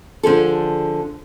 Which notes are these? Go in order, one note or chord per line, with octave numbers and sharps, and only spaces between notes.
D3 F3 G#4 A4